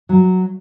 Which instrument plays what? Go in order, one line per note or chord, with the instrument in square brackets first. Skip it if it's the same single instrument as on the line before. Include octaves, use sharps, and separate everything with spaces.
[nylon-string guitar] F#3